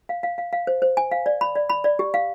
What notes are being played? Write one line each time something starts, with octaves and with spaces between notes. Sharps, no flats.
F5
F5
F5
F5
C5
C5
G#5
F5
D5
B5
D5
B5
D5
G4
F5